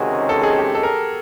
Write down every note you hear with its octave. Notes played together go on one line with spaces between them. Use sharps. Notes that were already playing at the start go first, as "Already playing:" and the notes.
Already playing: C#2 C3 D#3 G#3 C#4 F#4
A4
G#4
G4
A4
A#4